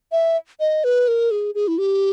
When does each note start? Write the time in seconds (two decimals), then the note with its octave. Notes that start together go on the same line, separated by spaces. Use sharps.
0.12 E5
0.60 D#5
0.84 B4
1.08 A#4
1.31 G#4
1.55 G#4
1.68 E4
1.78 G4